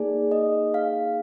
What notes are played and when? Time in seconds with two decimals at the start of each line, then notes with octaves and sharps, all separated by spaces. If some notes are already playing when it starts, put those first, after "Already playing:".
Already playing: A#3 D#4 G#4 D5
0.31 D#5
0.74 F5